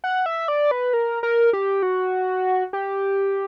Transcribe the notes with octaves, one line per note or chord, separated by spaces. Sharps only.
F#5
E5
D5
B4
A#4
A#4
G4
F#4
G4